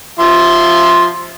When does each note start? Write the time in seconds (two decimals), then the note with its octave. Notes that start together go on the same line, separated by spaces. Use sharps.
0.20 F3 E5 C6